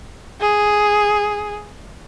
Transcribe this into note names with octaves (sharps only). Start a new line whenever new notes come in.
G#4